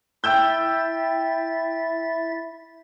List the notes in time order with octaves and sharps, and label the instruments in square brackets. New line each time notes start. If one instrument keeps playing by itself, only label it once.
[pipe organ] E4 E5 A6 [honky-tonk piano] G5 E6 G6